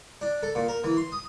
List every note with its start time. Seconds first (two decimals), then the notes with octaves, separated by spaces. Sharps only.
0.21 D4
0.43 A4
0.55 A#2
0.68 A#4
0.84 E3
0.97 C6
1.12 D#6